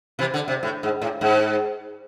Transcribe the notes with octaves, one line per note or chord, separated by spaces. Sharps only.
C3 E3
D3
C3
A2
G#2
A2
G#2